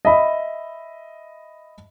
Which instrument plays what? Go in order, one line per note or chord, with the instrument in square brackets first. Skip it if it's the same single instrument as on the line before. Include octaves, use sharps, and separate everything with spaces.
[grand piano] D#5 E5 B5